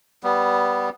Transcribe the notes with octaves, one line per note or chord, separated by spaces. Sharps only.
G3 B3